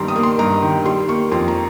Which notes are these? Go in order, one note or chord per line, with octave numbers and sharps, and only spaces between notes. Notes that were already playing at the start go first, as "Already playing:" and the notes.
Already playing: G2 D#3 G3 A#3 A#5 C6
D#6
A#3
C6
G2 A#5
D#3
G3 C6
A#3 C#6
F2 C6
A#5